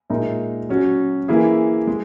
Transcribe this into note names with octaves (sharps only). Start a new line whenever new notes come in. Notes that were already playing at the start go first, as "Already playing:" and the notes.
A#2 G#3 D#4 A#4 E5
F#3 C#4 F#4
E3 A#3 E4 G#4
G#3